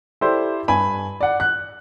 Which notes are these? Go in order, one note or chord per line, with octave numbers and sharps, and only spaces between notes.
E4 G4 A4 C5 D5
G2 G#5 B5
D5 F#5
F#6